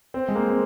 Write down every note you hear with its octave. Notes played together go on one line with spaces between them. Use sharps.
C4
G#3
A#3
C4